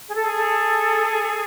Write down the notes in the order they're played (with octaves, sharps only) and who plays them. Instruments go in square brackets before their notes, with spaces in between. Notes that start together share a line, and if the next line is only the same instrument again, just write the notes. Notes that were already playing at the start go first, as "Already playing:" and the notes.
[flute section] G#4
A4
[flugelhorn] G#4
[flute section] A4